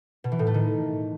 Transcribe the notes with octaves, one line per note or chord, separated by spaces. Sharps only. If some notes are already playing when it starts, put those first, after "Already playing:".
B2
E3
A2
A3
D#3